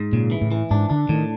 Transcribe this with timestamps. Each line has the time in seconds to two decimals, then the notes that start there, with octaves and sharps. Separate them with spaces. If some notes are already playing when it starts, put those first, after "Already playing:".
Already playing: G#2
0.13 A#2 C#3
0.31 E3
0.41 A2
0.52 E3
0.71 G#2 D4
0.90 D3 D4
1.09 A2 D#3